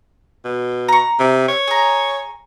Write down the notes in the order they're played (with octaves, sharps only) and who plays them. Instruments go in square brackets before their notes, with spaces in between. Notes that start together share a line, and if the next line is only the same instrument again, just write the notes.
[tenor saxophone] B2
[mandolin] A#5 C#6
[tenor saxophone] C3
C#5
[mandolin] G#4 A#5